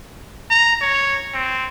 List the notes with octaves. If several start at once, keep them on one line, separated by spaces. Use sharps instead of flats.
A#5
C#5
C4